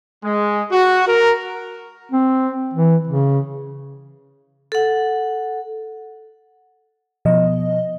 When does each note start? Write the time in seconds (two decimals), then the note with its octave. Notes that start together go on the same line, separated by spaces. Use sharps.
0.24 G#3
0.71 F#4
1.08 A#4
2.12 C4
2.74 E3
3.07 C#3
4.72 A4 F#5
7.25 B2 F3 D#5